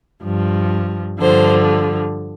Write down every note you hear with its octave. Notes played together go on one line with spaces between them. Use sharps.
G2 F3
G2 D3 F3 C5